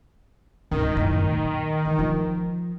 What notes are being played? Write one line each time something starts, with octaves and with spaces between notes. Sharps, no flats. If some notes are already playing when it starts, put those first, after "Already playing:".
G#1 C#2 D#3
F#2 A2
A#2
E3
F3 F4